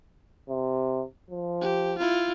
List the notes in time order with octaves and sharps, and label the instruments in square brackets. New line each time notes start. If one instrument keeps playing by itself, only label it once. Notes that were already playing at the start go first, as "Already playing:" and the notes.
[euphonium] C3
F3
[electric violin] G4
E4 F4